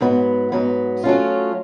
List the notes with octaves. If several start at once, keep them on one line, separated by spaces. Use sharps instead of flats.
G#2 F#3 B3
G#2 F#3 B3
F#3 A3 C#4 F4